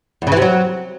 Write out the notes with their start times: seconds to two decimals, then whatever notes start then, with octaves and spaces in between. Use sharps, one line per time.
0.22 E2
0.27 C#3
0.32 E3
0.37 C3
0.42 F#3